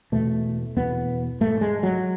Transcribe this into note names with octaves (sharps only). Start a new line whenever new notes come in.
E2 B2 A3
E2 B2 B3
G#2 A3
G#3
F#3